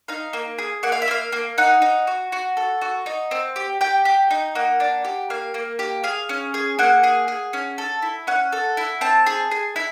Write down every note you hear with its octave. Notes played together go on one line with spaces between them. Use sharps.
D#4 F5
A#3
G#4
A#3 F#5
F5
E5
A#3 F5
A#3
D#4 F#5
D#4
F#4
F#4
A4
F#4
D#4
C4
G4
G4 G5
G4
D#4
A#3 F#5
D4
G4
A#3 F5
A#3
G4
G#4 F5
C#4
G#4
A#3 F#5
G#4
G#4
C#4
A4
E4
C#4 F#5
A4
E4
C4 A5
G#4
G#4
E4